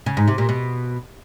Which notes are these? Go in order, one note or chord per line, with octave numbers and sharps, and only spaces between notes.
C#3
G#2
C3
A#2
B2